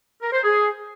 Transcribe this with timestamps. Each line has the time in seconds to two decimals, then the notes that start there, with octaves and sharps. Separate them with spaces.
0.22 A#4
0.33 C5
0.43 G#4